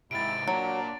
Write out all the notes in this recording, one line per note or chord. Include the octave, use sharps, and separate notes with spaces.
G#2 C3 E4 A6 D7
A#2 F#3 D4 D7